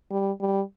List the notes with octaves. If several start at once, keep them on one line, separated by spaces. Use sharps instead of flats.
G3
G3